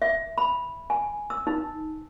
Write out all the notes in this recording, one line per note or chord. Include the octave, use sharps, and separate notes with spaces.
E5
B5
G#5
E6
D#4